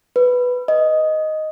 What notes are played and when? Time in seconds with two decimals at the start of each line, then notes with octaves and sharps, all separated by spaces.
0.16 B4
0.68 D#5